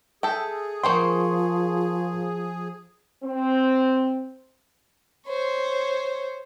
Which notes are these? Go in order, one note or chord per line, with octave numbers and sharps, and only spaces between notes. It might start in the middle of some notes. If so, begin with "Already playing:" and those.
G#4 A4 E5 G5
F3 A#3 C5 G5 C6 C#6
C4
C5 C#5